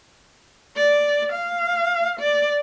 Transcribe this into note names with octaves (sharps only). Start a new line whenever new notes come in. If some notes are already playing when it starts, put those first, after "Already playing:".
D5
F5
D5